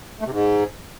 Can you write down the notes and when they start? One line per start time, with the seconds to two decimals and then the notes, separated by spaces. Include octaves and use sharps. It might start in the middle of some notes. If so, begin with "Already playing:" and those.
0.21 A3
0.26 C3
0.31 G#2